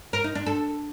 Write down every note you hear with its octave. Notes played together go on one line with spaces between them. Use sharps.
A#4
D#4
D4
A4